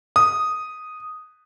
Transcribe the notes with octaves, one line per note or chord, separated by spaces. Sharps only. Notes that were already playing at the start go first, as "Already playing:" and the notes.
D#6